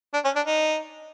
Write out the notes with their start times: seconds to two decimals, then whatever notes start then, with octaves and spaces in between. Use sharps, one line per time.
0.14 D4
0.25 C#4
0.36 D4
0.46 D#4